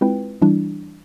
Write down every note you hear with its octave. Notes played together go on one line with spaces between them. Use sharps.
G#3 C4 E4 F4 B4 G5
E3 G3 D4 E4